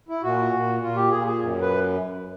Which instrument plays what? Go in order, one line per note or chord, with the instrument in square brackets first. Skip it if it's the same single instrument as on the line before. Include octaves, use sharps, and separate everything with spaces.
[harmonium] E4
A#2 F#4
A#2
A#2 F4
G4
A#2 G#4
G#4
F#2
B4